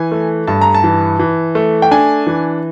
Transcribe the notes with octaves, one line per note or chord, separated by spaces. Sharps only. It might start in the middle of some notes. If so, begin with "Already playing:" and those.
Already playing: E3 G#5
A3
G2 A5
A#5
A5
E3
E3
A3
G5
D4 G#5
E3